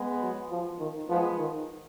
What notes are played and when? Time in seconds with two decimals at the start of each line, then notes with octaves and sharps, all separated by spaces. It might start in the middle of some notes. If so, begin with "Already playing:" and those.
Already playing: G#3 B3
0.22 F#3
0.50 F3
0.79 D#3
1.09 F3 G#3 B3
1.38 D#3